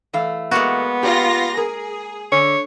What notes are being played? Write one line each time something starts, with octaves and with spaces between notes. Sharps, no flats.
E3 A3 F5
G#3 A#3 B3 F#4
F4 G4 A#6
G#4 A#4
D3 C#5